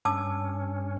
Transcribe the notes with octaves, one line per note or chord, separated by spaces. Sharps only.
G2 C#4 A5 D6 E6